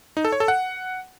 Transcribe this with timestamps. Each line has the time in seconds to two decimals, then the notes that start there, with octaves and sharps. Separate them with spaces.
0.17 D#4
0.25 A4
0.32 C#5
0.40 A4
0.48 F#5